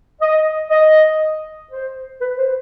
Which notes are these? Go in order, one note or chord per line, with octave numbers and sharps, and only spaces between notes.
D#5
D#5
C5
B4
C5